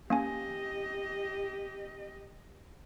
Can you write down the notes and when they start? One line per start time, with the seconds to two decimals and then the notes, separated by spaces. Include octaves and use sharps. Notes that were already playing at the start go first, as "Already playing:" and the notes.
0.10 A#3 C#4 G4 D#5 G#5